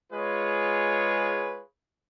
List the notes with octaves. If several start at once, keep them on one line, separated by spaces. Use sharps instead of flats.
G#3 F4 G#4 B4 C#5